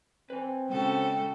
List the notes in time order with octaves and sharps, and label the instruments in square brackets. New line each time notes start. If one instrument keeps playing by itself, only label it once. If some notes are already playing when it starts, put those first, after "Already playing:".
[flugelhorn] C4 [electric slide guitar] B4 G#5
[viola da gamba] C#3 F#4 A4 [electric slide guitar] G#3 [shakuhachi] G5